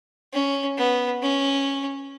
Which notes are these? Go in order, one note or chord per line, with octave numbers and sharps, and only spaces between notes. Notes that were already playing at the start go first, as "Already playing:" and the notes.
C#4
B3
C#4